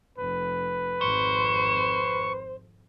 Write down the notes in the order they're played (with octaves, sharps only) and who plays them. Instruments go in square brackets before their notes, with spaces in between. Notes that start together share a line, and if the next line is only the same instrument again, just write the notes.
[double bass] F1 [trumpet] B4
[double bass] G#1 F2 [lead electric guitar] C5 [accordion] C#6